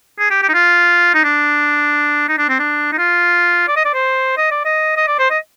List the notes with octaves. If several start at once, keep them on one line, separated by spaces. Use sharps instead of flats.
G#4
G4
G4
D#4
F4
D#4
D4
D#4
D4
C4
D4
D#4
F4
D5
D#5
D5
C5
D#5
D5
D#5
D#5
D5
C5
D#5